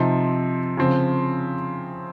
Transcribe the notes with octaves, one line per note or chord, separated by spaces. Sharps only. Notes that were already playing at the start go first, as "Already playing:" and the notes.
Already playing: C3 F3 C4 D#4
C#3 F3 C4